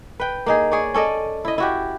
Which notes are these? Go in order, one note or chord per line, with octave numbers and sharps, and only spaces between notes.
B4 G5
A#3 D#4 G#4
G#4 C#5 D5
C#4 A4 D5 D#5
E4 D#5
E4 F#4 G4